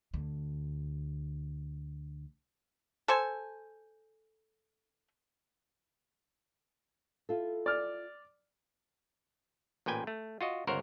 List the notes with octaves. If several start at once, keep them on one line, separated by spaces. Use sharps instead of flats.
D2 D3
A4 C5 G#5
E4 F4 A4
D5 F6
A1 A#2 B4 G5 G#5
A3
F4 F#4 D#5
G1 C#2 A#4 C5 C#5 F#5